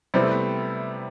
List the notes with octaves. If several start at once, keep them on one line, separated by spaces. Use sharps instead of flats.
C3 G3 B3 C4 E4
A3
B3